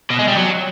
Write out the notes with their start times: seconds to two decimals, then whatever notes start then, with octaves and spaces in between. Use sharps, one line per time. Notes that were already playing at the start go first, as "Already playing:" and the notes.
0.10 B2
0.19 G#3
0.28 G3
0.36 F#3